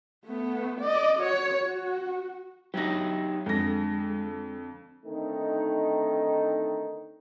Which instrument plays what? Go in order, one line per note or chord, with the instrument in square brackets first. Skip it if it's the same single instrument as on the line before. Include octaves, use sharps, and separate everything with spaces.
[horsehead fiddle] A3 B3
D5 D#5
F#4 C#5
F#4
[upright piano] F#3 A#6 [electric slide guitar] D#4 E4 G4
[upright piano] F2 D3 A#6 [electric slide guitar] G#3
[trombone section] D3 D#3 A3 C4 D#4 A4